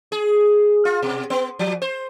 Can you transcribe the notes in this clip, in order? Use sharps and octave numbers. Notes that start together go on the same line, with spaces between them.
G#4
F4
B2
B3
F3
C5